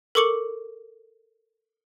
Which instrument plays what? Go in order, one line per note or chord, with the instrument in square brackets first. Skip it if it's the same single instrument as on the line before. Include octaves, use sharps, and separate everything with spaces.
[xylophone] A4 A#4 C#6 D6 C#7 F#7